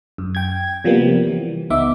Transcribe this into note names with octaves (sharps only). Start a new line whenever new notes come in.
F#2
G5 G#6
C3 F3 G3 A#3 B3
E3
C#2 B3 D#4 E5 D6